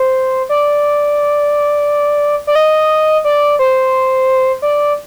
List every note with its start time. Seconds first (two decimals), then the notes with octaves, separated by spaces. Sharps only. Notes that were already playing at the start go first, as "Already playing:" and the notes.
Already playing: C5
0.49 D5
2.47 D5
2.55 D#5
3.24 D5
3.59 C5
4.62 D5